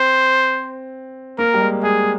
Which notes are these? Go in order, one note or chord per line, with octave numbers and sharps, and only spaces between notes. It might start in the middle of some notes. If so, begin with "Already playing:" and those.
Already playing: C4 C5
A#3 A#4
G3
G#3
G#3 G#4